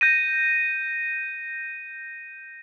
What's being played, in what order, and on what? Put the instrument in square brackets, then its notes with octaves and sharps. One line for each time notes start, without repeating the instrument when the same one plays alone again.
[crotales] G6 A#6 D#7